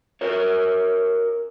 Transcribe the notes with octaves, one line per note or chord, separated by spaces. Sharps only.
F#4 A#4 C#5